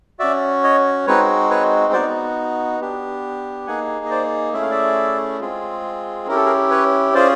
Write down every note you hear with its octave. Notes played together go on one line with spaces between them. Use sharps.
C#4 F#4 D5 E5
C#5 D#5
G#3 C4 D#4 F#4 B4 C#5
B4 C#5
B3 D#4 F#4 C5 D5
B3 D4 G4
A#3 D#4 G#4 F#5 G#5
D#5
C5 D5
A3 C#4 E4 G#4 E5
F5
D5 E5
G#3 C4 F4 G#4
C#4 E4 G4 A#4
A4
G#4 A#4
B4 C#5
C#4 F4 G#4 C5 D5